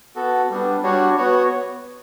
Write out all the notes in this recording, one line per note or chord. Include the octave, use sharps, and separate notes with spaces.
B3 F#4 A4
G3 B3 D4
G3 D4 F#4 C#5
B3 F#4 C#5